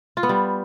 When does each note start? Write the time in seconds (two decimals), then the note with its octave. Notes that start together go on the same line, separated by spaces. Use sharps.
0.17 F4
0.23 B3
0.29 G3